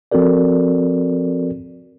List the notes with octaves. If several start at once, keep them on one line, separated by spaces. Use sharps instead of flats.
F3 C4 F#4 A4 A#4 D5